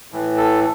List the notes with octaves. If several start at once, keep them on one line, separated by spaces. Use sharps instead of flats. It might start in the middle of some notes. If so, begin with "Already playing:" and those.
A2 E3
A4